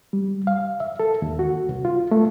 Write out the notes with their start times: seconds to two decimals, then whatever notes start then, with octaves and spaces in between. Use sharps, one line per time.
0.13 G3
0.47 F5
0.80 E5
1.00 A4
1.22 D#2
1.39 F#4
1.69 C2
1.85 F4
2.11 A3